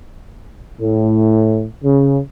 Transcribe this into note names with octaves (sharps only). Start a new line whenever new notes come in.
A2
C#3